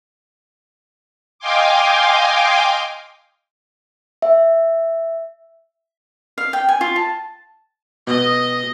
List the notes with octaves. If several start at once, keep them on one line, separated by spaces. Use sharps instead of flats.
D#5 F5 G5 G#5 C6 D6
E5
F5
G5
G#5
F4
A5
B2 D#5